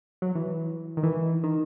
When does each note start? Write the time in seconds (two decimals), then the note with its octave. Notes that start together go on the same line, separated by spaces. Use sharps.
0.22 F#3
0.35 E3
0.97 D#3
1.03 E3
1.44 D#3